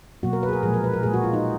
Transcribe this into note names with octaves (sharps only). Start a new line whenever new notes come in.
B2 F#3 A#3 F#4
A#4
B4
G#4
A#4
A#2 F3 G#3 G#4
A#4
B4
A#4
A#2 G#3 G#4
F#4
F4
D#4